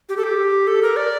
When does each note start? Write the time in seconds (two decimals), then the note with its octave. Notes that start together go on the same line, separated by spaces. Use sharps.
0.09 G4
0.17 A4
0.23 G4
0.67 A4
0.82 A#4
0.96 D5